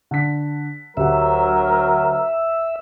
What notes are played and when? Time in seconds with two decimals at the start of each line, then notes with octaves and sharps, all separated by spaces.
0.11 D3 B6
0.97 D2 F#3 G4 A#4 E5 F#5